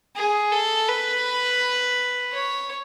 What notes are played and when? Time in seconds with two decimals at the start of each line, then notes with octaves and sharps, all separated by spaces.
0.16 G#4
0.52 A4
0.88 B4
2.33 C#5